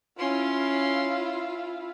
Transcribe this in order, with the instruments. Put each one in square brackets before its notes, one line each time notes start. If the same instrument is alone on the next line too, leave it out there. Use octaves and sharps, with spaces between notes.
[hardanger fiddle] C#4 C6 [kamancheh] E4 F4